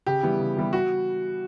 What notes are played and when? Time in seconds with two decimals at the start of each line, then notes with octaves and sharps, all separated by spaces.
0.06 C#3 G4
0.23 E3 G3 B3
0.39 C#3
0.57 E3 G3 B3
0.73 F#4